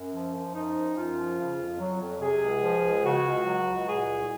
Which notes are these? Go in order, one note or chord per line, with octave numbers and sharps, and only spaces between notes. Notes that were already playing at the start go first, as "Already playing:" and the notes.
Already playing: F#2
F3
F#2
F3 D#4
F#2
F#2 F4
F3
C#3
F2
F#3
F2
C3 G#4
C#2
F3
C#2
C#3 F#4
C#2
F#3
C#2
A#2 G#4
C2